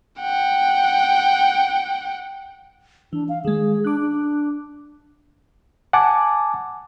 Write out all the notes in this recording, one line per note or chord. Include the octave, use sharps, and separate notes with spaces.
F#5 G5
E3 D4
F5
D#3 G#3 G#4
D4 D6 F#6
D4
F#5 G#5 A5 D6